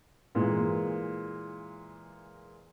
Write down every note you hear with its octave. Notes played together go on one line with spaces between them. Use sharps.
A#2 E3 G#3 A#3